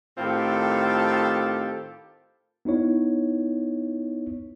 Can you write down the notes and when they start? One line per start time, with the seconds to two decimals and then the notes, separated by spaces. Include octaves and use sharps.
0.18 A2 D#3 C4 F4 G4 A4
2.65 B3 D#4 E4 C#5